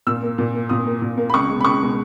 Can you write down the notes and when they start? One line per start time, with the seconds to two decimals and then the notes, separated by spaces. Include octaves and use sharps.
0.07 A#2 E6
0.22 A#3
0.38 A#2
0.54 A#3
0.69 A#2 D#6
0.86 A#3
1.02 A#2
1.17 A#3
1.30 B5
1.34 C#2 C#6
1.49 G#3
1.54 B2
1.61 B5
1.64 C#2 C#6
1.81 B2 G#3